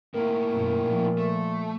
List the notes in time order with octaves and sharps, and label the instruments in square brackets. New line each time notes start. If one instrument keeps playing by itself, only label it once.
[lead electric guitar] A2 A#3 [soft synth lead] A#4
[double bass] F#2 B2
A#2 F3
[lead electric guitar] A3